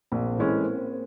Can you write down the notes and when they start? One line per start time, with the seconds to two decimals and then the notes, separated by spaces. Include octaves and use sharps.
0.12 A#1 A#3 C4
0.37 A2 E3 G#3 C#4